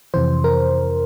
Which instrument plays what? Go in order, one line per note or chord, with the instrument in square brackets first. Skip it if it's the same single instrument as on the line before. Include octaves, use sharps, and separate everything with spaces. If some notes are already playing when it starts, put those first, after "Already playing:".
[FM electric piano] F2 C3 E3 C5
A#4